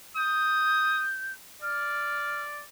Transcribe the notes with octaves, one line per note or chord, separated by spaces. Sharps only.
D#6 G6
D5 F6